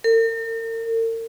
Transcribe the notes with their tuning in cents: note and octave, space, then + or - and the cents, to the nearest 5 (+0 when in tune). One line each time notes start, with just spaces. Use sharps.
A#4 -45